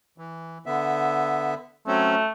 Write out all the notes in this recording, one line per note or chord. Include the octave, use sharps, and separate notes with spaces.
E3
D3 B3 E5
F#3 A3 C4 C#4